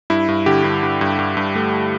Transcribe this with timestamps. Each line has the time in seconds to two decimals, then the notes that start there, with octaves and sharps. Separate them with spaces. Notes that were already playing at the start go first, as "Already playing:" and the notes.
0.10 G2 E4
0.28 G2
0.46 D3 G4
0.64 G2
0.83 G2
1.01 G2
1.19 G2
1.37 G2
1.55 A3